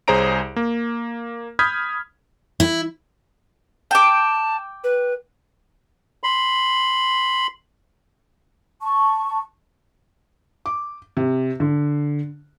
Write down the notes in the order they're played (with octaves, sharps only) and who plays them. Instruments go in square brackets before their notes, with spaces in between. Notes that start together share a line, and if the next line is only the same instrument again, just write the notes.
[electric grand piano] C2 G#4 C5 C#5 A#5 D7
A#3
B5 D#6 F6 G6 G#6 B6
[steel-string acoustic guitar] E4
[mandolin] G5 D6 [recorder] A5
[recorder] B4
[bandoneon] B5 C6
[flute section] A5 C#6
[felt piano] D6
C3
D3